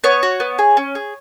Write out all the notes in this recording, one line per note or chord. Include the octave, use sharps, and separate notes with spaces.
B3 C#5
F#4
B3
G#4
C#4
G#4